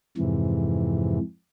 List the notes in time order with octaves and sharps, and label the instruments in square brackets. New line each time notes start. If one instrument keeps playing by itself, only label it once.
[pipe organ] F2 G#2 C3 E3